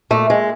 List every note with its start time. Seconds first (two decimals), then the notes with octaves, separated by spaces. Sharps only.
0.10 A#2 A3
0.30 G#3